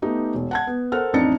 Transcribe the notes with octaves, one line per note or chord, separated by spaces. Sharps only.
A3 B3 D#4 G4
E1
F#5 A5 G#6
B3
A4 A#4 C5 F#5 F6
A1 F2 D4 D#4 A6 C#7